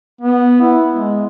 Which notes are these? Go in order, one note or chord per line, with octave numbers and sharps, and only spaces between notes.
B3
E4
G#3